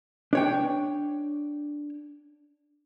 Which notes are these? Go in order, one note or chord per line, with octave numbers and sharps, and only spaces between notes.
D4 C#5 G5